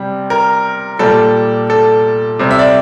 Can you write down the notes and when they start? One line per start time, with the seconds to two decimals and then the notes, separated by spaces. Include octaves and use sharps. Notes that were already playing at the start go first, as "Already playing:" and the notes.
Already playing: C3 G3
0.30 A#4
0.99 A#2 G3 A4
1.70 A4
2.39 C3 G3
2.51 E5
2.59 D5